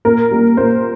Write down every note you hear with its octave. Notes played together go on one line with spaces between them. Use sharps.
A#2 A#4
G3 A#3
A#2 C5